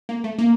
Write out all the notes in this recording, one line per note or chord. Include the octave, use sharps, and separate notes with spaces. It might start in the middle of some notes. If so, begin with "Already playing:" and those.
A#3
A3
A#3